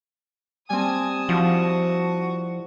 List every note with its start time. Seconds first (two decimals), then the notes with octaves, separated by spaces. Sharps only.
0.70 G3 C4 G#5 A5 D#6
1.29 F3 E4 F#4